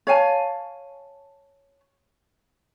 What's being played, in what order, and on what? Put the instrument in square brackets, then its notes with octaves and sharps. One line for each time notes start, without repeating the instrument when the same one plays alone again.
[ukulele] C#5 F5 G#5 A5